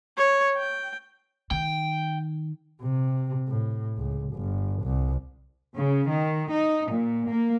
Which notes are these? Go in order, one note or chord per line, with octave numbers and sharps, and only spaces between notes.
C#5
G5
D#3 G5
C3
A2
C#2
G1
C2
C#3
D#3
D#4
A#2
A#3